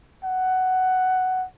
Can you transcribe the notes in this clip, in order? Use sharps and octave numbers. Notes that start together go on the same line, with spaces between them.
F#5